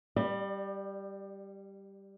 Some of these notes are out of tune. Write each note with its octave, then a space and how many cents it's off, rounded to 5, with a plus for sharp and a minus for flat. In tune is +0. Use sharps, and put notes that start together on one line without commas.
G3 +0 D5 +35